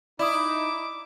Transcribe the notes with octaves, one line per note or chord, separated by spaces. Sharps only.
D#4 E4 D5 D6 D#6